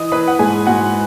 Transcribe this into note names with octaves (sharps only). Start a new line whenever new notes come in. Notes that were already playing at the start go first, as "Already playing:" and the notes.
Already playing: E3 D#5 D#6
E3 B4 B5
F#5
G#2 G#4 G#5
G#2 F#4 F#5